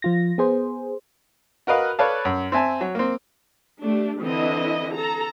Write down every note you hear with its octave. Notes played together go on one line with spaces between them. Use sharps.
F3 F4 A#6
B3 G#4 C5
F#4 A#4 B4 D#5 F5
A4 B4 C#5 D5 F5 A5
F#2
C4 E5 G#5 A5
F#3
A#3 C4
A3 D4 G4
D3 E3 C4 E4 D#5
A4 A#5